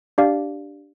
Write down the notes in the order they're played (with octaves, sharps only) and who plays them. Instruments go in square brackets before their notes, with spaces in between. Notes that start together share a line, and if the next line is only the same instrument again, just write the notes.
[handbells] D4 G4 D5 F5